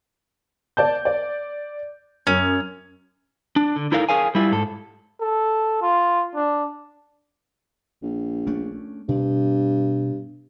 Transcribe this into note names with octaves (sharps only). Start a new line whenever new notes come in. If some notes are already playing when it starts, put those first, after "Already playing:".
D5 A5 G6
D5
F#2 C#4
D4
D3
D#4 E4 A4 A#4 F5
G#4 A#4 F5 G#5
G3 E4 F4
G#2 A4
A4
F4
D4
A#1
A3 C#4 D4
G2 B2